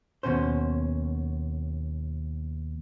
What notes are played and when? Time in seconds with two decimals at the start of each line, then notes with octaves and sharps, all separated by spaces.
0.23 D#2 B2 C#4 C5